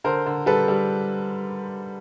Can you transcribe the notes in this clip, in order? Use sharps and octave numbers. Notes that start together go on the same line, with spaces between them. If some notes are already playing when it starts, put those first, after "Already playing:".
D3 A#4 C5
D3
G3 A4 B4
G3